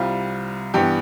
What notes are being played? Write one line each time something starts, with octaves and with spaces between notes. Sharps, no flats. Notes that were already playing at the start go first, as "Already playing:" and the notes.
Already playing: C2 C3 G3 F4
G2 E3 B3 G4